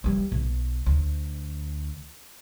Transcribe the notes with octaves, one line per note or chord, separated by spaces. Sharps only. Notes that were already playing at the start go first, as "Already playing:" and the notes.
E3 G3
B1
D2